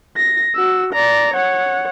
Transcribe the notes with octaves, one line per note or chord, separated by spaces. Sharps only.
A#6
F#4 E6
D5 A#5
C#5 F#5